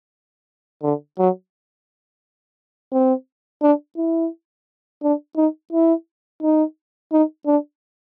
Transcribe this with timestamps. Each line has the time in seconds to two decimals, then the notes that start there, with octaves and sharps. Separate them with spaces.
0.83 D3
1.19 F#3
2.92 C4
3.62 D4
3.97 E4
5.03 D4
5.37 D#4
5.72 E4
6.42 D#4
7.12 D#4
7.46 D4